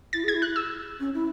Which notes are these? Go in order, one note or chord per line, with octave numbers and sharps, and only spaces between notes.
E4 A6
G#4
G#6
E4
F#6
E6
C#4
E4